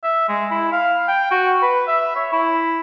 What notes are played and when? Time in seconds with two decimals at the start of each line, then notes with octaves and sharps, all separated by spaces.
0.03 E5
0.29 G#3
0.51 E4
0.72 F5
1.08 G5
1.31 F#4
1.62 B4
1.87 E5
2.16 C#5
2.32 E4